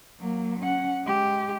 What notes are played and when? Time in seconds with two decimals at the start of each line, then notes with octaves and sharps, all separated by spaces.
0.20 F#3 A#3
0.60 C#4 F#5
1.04 G#3 G4